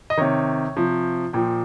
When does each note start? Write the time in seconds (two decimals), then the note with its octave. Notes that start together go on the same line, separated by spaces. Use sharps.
0.10 D#5
0.17 C3 D#3 C#5
0.77 C3 F3
1.33 A#2 F3 G5